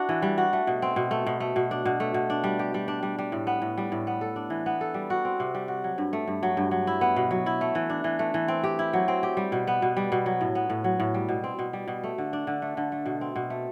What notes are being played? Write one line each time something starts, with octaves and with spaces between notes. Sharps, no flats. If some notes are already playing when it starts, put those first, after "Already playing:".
Already playing: D4 E4 F#4
E3
G3
F#4
A3
B2
C4
B2
A3
B2
A3
B2
D4
B2
A3
B2
D4
G3
G4
G3
D4
G3
G3
A2
B3
A2
G3
A2
B3
A4
D4
E3
B3
A4
G3
F#4
C4
C3
G3
F#4
F#3
G2
A3
G2
F#3
G2
F#3
E4
B3
B2
F#3
E4
A3
E3
D4
E3
A3
E3
C4
G4
E4
F#3
C4
G4
G3
B2
B3
B2
G3
B2
F#3
A2
B3
A2
F#3
A2
G3
B2
C4
B2
G3
B2
A3
D3
D4
D3
A3
D3
A3
B2
C4
B2
A3